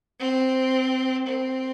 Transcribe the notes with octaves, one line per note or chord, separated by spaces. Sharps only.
C4
C4